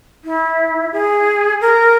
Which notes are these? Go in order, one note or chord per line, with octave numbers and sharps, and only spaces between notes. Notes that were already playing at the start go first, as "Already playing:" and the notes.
E4
G#4
A#4